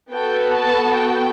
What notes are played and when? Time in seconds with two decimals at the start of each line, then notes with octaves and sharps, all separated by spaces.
0.12 B3 F#4 A4 G5
0.54 A5
0.95 G5